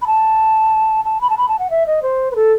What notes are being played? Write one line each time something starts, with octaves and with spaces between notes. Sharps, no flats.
B5
A5
A5
B5
A5
B5
A5
F#5
E5
D#5
C5
B4
A4